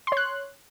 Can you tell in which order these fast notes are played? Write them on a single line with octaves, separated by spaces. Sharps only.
C6 C#5 F#6